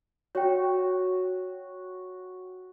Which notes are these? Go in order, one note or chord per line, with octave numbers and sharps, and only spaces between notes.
F#4 C#5 G5